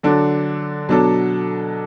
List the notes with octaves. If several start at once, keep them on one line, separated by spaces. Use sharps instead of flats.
D3 F#3 D4 A4
B2 F#3 D4 A4